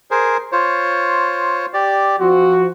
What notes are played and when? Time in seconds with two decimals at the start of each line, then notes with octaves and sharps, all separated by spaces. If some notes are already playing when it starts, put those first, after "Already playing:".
0.11 G#4 A#4 C5
0.52 F4 C5 C#5
1.74 G4 D5
2.20 F3 C4 F#4